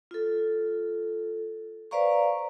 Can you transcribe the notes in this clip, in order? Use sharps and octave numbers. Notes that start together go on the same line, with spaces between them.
F4 A4
B4 C5 D5 F5 A#5 C#6